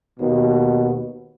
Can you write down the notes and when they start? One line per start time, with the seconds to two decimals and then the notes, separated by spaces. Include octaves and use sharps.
0.20 D#2 B2